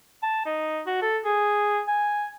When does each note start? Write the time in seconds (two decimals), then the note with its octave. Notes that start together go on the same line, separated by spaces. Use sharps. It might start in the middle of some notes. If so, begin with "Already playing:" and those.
0.23 A5
0.46 D#4
0.86 F#4
1.02 A4
1.25 G#4
1.87 G#5